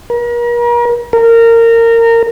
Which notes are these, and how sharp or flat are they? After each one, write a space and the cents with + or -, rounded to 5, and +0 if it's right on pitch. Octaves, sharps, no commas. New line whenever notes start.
A#4 +40
A#4 -20